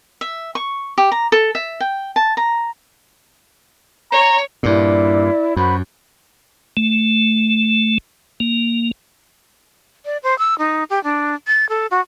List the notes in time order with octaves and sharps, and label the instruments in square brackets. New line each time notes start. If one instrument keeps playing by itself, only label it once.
[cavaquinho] E5
C#6
G4
A#5
A4
E5
G5
A5
A#5
[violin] C#5 [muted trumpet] A#5
[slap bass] G2 A#2 [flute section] E4 D5
[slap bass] F#2 [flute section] F#4 C5 B5
[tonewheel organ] A3
A#3
[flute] D5
C5
E6
D#4
G4
D4
A6
A4
F#4